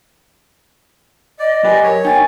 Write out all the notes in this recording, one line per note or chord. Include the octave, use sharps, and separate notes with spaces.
D5 D#5
F#2 G4 B4 D5 G#5
A#4 C#5
B3 D#4 G5 G#5 A6